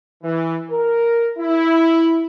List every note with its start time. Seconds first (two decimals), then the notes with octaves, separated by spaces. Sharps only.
0.23 E3
0.70 A#4
1.38 E4